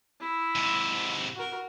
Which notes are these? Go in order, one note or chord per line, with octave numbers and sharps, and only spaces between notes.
E4
G#2 C3
F#4 A#4